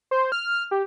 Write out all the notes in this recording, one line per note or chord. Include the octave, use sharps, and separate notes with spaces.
C5
F6
G4